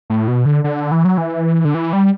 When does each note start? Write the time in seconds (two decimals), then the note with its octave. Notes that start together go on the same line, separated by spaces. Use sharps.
0.10 A2
0.28 B2
0.46 D3
0.64 D3
0.92 E3
1.05 F#3
1.18 E3
1.65 D3
1.74 E3
1.93 G3